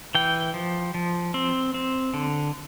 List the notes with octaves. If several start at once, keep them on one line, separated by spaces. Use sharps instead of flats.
E3 G5
F3
F3
C4
C4
D3